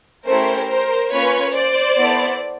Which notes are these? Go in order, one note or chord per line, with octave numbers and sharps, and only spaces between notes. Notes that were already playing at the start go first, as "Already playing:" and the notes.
A3 C#4 E4 G4 A#4 C5
A#4 C5
A#3 C#4 F4 B4 C#5
C5 D5
B3 E4 A4